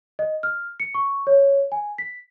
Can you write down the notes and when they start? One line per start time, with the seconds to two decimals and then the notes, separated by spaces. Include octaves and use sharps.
0.19 D#5
0.43 F6
0.80 C#7
0.94 C#6
1.27 C#5
1.72 G#5
1.98 B6